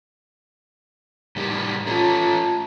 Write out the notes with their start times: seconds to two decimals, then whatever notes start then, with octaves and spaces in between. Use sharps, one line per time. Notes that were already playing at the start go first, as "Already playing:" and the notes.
1.36 A2 D#3 G3
1.87 A3 C#4 F4 A5 A#5